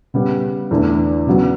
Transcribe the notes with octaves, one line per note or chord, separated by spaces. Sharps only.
C#3 G3 B3
E2 D3 A3 E4
C#3 F#3 B3